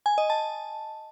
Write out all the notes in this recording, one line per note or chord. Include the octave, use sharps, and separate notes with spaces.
G#5
D#5
A5